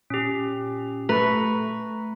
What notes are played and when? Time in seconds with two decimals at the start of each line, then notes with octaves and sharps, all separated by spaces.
0.10 A#2 C#4 G4
1.09 A3 B4 A#5 C#6